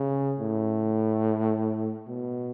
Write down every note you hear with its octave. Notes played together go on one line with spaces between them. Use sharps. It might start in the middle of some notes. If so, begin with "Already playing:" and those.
Already playing: C#3
A2
B2